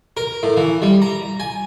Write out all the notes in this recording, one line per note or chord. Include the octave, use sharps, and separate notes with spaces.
A#4
A2
E3
G3
A#5
G#5